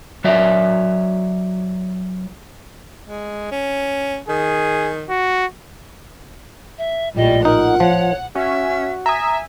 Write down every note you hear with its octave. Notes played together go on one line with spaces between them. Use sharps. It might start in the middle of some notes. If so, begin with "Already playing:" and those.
F#3 F#4 C#5 D5 E5
G#3
C#4
D#3 G#4
F#4
E5
A#1 A2 G3 F4 D#5
D#4 A#4 F#5
F3 C#5
C#4 F#4 E5
E5 G#5 A#5 D#6